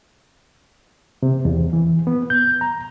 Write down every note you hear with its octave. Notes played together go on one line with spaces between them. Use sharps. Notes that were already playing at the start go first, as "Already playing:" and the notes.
C3
E2
E3
B3
G6
A#5